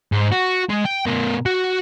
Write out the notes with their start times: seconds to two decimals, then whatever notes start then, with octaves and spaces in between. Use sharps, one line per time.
0.12 G#2
0.32 F#4
0.70 G#3
0.85 G5
1.06 B2 A#4
1.46 F#4 F#5